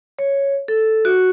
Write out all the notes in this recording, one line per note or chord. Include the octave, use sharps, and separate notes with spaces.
C#5
A4
F#4